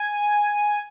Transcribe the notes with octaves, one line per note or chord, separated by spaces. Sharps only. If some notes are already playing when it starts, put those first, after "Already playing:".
Already playing: G#5